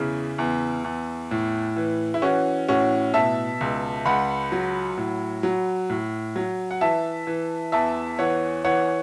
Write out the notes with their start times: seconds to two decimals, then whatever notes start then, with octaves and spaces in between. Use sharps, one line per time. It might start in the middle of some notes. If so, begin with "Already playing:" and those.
Already playing: E2 C#3 E4
0.38 E2
0.84 E2
1.31 A2
1.76 E3
2.14 E4
2.22 E3 C#4 F#4
2.69 A2 C#4 F#4
3.14 B2 E5 A5
3.61 C#2
4.05 C#2 F#5 B5
4.52 F#3
4.98 A2
5.43 F#3
5.90 A2
6.36 F#3
6.71 F#5
6.81 E3 E5 A5
7.27 E3
7.72 E2 E5 A5
8.19 E3 C#5 F#5
8.65 E3 C#5 F#5